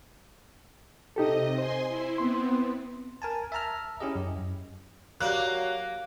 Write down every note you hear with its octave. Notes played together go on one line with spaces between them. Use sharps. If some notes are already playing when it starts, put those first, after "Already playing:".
C3 D#4 G4 A4 D#5
C5 G#5 C6
E4
B3 C4 C6
A#4 G#5 A5
E5 A5 A#5 F6
C#4 E4 G4 G#4 D#5
F#2
F#3 A#3 G4 D5 F5 F#6